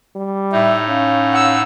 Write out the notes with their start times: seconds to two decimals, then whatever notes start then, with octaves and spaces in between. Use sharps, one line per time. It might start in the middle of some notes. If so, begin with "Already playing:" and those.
0.15 G3
0.52 A2 D#4 E5
0.88 C#4 F5
1.32 F#5 E6